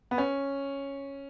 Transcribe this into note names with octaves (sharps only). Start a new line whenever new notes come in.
B3
C#4